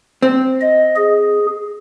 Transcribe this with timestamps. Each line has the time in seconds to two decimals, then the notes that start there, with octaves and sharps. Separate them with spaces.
0.22 C4
0.61 D#5
0.96 G#4